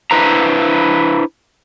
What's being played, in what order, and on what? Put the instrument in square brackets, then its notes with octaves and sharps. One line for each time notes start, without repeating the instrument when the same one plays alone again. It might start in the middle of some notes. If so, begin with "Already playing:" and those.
[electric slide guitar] D4 E4 B4 C5 A#5